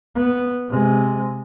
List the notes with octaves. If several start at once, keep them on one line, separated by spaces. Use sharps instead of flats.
B3
C3 G#3